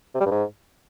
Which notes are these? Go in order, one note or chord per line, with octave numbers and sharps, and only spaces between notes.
C3
G3
G2
G#2